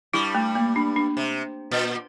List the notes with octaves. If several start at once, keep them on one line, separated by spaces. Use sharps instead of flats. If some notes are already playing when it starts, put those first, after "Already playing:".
G2 G3 E4
A3
A#3
D4
D4
C3
A#2